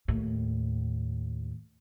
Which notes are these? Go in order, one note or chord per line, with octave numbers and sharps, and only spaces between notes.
D#2 A2